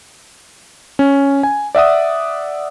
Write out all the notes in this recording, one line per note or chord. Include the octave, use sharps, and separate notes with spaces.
C#4
G#5
D5 E5 F#5 D#6